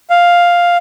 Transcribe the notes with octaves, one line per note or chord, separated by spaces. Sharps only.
F5